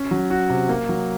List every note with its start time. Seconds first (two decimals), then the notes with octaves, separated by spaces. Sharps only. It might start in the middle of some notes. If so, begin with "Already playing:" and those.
Already playing: C#4
0.11 F#3
0.30 F#4
0.50 C3
0.69 A#3
0.89 F#3